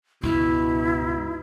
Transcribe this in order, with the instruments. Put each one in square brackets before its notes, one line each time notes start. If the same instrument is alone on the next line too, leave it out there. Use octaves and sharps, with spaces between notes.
[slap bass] C#2 G2 [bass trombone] B2 [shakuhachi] E4